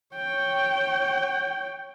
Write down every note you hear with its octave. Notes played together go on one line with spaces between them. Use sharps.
C#5 G5